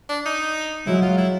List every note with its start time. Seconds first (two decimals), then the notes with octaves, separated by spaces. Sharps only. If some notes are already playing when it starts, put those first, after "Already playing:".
0.09 D4
0.26 D#4
0.87 F#3 G#3 E4
1.02 F4
1.18 E4